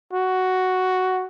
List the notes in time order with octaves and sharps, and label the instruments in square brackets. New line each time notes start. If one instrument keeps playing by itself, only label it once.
[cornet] F#4